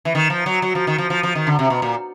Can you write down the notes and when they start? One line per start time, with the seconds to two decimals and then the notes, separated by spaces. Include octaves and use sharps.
0.05 E3
0.15 D#3
0.30 F3
0.46 F#3
0.62 F#3
0.75 F3
0.87 D#3
0.98 F3
1.10 F3
1.23 F3
1.35 D#3
1.47 D3
1.59 C3
1.70 B2
1.82 A#2